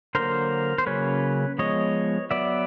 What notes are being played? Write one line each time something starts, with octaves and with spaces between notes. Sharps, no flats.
D3 F#3 A#3 A#4 C5
C5
C#3 F#3 A#3 C#4 B4 C#5
F3 G#3 B3 C#5 D#5
F#3 B3 D5 E5